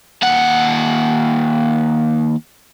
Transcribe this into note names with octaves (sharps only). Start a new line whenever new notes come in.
D#2 F#5